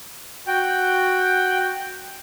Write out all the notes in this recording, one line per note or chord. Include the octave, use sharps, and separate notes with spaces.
F#4 G5